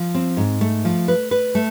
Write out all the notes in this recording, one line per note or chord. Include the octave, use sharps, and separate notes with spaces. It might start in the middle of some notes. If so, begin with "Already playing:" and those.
Already playing: F3
C4
G#2
A3
F3
B4
B4
A3